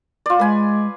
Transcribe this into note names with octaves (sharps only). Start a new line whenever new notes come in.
F4 D5
G#3 B4 G#5